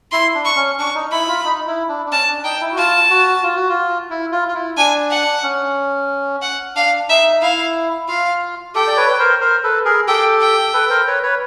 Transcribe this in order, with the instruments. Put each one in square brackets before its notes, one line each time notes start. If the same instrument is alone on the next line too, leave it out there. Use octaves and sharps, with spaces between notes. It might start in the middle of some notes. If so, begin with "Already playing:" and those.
[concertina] E4 [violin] C6
[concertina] D4
[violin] C#6
[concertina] C#4
[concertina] D4 [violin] C#6
[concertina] D#4
[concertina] E4 [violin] B5
[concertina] F4
D#4
E4
D4
D4
[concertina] C#4 [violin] A5
[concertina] D4
[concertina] D#4 [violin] G5
[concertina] E4
F#4
[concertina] F4 [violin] A5
[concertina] F#4
F4
F#4
F4
E4
F4
F4
E4
[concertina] D4 [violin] G#5
[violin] F#5
[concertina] C#4
[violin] F#5
[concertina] D4 [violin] F5
[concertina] D#4 [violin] E5
[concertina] E4 [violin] F5
[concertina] F4 [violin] F5
[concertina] G4 A4 [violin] G5
[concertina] D5
B4 C#5
B4
A#4 C5
A#4 C5
A4 B4
G#4 A#4
[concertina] G4 A4 [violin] G5
[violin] G5
[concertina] A4 B4
A#4 C5
B4 C#5
B4 C#5